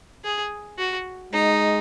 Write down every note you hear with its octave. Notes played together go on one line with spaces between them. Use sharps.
G#4
F#4
G#3 D#4